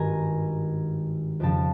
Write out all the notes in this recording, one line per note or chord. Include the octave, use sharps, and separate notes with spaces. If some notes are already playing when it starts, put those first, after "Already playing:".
Already playing: G#1 G2 D#3 G#5 A#5
F2 C#3 F3 G5 A5